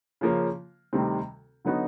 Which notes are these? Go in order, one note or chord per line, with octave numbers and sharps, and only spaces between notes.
C#3 F3 A#3 C#4
D2 C3 D#3 G3 C4
D3 F#3 B3 D#4 F#4